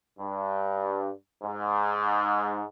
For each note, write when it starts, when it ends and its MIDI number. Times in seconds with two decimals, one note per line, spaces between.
0.19 1.10 43
1.43 2.61 44